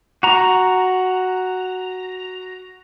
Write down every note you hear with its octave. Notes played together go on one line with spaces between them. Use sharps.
F#4 A#5